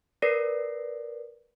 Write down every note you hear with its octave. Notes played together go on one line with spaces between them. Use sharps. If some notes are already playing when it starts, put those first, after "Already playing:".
A#4 B4 D5 A#6 C7